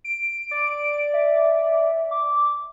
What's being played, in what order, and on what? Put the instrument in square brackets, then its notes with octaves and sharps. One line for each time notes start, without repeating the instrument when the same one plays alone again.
[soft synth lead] D7
[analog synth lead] D5
[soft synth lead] E5
D6